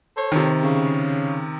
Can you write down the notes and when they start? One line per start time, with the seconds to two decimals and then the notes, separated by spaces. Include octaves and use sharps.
0.17 A4 C5 C#5
0.32 C3 D#3
0.64 C#3